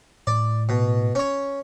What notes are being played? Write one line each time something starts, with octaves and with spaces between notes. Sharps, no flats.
A2 D5
B2
C#4 C#5